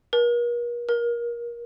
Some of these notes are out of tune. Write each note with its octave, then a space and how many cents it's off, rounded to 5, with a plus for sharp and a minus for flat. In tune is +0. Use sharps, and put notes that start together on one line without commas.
A#4 +45
A#4 +25